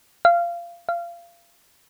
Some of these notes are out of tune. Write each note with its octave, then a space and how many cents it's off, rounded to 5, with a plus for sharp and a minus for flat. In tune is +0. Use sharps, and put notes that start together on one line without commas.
F5 -20
F5 -25